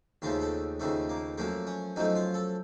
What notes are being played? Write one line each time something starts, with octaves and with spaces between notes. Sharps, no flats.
D#2 C#3 F3 A3 F4
A4
D#2 C#3 F3 A3
A#3
F#2 F3 A3 A#3
C#4
F#2 F3 A3 D#4
F4
A4